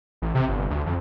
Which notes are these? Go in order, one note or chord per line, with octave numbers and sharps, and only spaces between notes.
A1
C3
G1
D2
F2